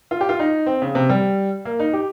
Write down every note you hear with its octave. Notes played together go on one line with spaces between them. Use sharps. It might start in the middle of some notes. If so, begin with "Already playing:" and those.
F4
G4
F4
D#4
C4
C#3
C3
G3
A#3
D#4
G4